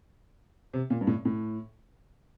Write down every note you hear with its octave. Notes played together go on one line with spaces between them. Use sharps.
C3
A#2
G2
A2
A2